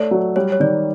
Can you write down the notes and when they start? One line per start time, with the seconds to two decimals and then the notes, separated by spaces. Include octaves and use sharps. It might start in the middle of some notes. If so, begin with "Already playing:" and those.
Already playing: A3 C#5 D5
0.11 F#3
0.36 G3 C#5
0.52 C#5
0.60 D#3 D5